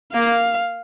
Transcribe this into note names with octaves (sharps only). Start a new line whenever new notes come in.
A#3 F5